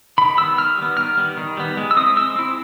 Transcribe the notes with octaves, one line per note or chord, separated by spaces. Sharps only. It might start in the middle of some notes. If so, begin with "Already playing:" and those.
D#3 B5
G3 B3 E6
D#3 F6
G3 B3
D#3 F6
G3 B3
D#3
G3 B3
G#3
E6
C4 E4 D#6
G#3 E6
C4 E4